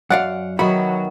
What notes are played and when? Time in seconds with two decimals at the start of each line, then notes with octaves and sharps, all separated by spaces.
0.10 F#2 D5 F5 F#5
0.59 D#3 F#3 B3 F#4 E5 B5